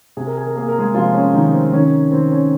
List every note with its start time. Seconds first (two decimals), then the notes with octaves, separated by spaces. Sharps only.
0.17 C3 G#4
0.27 A#4
0.38 G#4
0.47 A#4
0.56 A#3 G#4
0.68 A#4
0.79 G#3 G#4
0.95 C3 F3 F4
1.14 C#4
1.34 C3 D#3 D#4
1.54 C4
1.72 D#3 C#4
2.11 D#3 C4
2.32 C#4